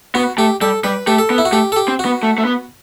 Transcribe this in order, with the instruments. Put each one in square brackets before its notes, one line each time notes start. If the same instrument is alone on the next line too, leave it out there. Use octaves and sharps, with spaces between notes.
[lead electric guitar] B3 [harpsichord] F#4
[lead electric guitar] A3 [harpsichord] G4
[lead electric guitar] G3 [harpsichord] A4
[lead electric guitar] G3 [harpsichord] B4
[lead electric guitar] A3 [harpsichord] G4
[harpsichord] A4
[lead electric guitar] B3
[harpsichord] E4
F#4
[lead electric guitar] A3 [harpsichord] G4
[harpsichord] A4
G4
[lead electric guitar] C4
[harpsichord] F#4
[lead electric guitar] B3
A3
A3
B3